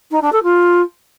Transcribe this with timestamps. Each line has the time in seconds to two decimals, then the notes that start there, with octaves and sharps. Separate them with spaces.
0.11 D#4
0.22 D4
0.32 A4
0.43 F4